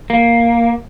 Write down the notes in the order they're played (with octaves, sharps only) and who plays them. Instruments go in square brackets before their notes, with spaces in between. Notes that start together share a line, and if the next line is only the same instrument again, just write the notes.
[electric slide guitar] A#3